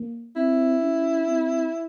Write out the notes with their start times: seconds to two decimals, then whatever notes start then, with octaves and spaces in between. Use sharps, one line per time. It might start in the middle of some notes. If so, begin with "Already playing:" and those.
Already playing: A#3
0.36 C4 E4
0.82 C#4
1.26 C4